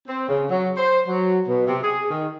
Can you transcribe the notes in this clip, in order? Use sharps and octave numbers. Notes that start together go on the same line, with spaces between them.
C4
C#3
F#3
C5
F#3
B2
C3
G#4
D#3